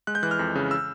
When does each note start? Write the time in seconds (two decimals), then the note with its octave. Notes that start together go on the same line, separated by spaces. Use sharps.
0.07 G#3 F#6
0.15 G6
0.23 E3 F#6
0.31 F6
0.39 F2
0.55 C#3
0.71 E6